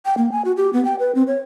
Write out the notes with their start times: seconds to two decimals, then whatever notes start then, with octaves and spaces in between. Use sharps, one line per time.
0.05 G5
0.17 A#3
0.32 G#5
0.45 F#4
0.57 G4
0.73 B3
0.85 G5
0.99 B4
1.15 C4
1.27 C#5